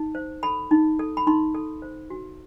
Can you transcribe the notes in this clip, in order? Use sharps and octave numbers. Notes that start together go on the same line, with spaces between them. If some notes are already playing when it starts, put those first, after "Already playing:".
Already playing: D#4
C5
A4 B5
D#4
A4
B5
D#4 C6
A4
C5
F#4